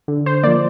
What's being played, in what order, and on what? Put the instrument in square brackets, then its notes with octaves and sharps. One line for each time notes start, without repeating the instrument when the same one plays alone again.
[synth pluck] D3
C5
F3 A#3 D5